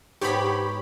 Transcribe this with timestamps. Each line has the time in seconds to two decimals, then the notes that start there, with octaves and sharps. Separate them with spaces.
0.21 G#2 B3 G4 G#4 C#5 B5 C#6